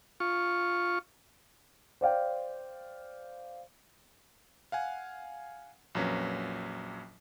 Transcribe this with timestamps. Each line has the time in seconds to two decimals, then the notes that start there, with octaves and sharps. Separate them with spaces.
0.20 F4 C#6
2.01 C5 D5 F5 G5
4.72 F5 F#5 G#5
5.95 A#1 F2 F#3 A#3 C#4 B4